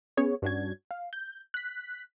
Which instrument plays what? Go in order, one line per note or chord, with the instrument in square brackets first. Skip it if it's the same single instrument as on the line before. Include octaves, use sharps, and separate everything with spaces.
[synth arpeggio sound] B3 C#4 G#4 C#5
G2 C#4 D4 F#4 G#6
F5
G6
F#6 B6